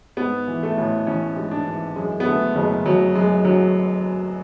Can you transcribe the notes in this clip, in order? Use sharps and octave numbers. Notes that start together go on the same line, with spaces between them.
G#2 B3
E3
A3
A1
A1 C#4
G#2
D4
E3
F#2 G#3
B3
D3 A3
F#1 G#3
F#1 F#3
F#2 G#3
D3 F#3